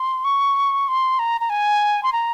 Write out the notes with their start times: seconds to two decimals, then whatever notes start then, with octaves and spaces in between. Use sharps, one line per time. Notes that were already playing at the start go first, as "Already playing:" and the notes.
Already playing: C6
0.25 C#6
0.88 C6
1.19 A#5
1.41 A#5
1.50 G#5
2.03 C6
2.13 A#5